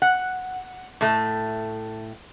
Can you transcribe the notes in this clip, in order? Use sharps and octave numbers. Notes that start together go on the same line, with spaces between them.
F#5
A2 A3